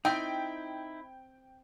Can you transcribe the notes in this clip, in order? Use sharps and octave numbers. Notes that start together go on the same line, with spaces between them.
C4 D#4 E4 G5